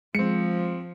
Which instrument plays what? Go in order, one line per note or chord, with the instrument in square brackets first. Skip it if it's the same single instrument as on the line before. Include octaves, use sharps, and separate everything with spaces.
[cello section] F3 [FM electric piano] G#3 [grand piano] C4 C#7